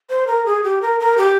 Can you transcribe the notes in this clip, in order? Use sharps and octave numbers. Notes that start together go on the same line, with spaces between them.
C5
A#4
G#4
G4
A#4
A#4
G4